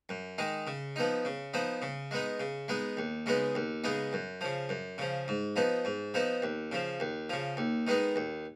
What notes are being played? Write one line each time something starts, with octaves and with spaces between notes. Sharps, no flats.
F#2
D#3 G#3 D#4
C#3
F3 B3 D#4
C#3
F3 B3 D#4
C#3
G#3 B3 D#4
C#3
G#3 B3 D#4
D#2
C#3 G#3 B3 D#4
D#2
C#3 G#3 B3 D#4
F#2
C#3 F3
F#2
C#3 F3
G#2
F3 B3 D#4
G#2
F3 B3 D#4
D#2
C#3 F3
D#2
C#3 F3
D#2
D#3 G#3 B3 D#4
D#2